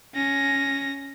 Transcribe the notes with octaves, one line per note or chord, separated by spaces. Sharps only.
C#4 A#6